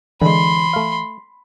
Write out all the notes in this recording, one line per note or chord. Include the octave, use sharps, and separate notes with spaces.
D3 E3 G#3 B5 C6
A3 F5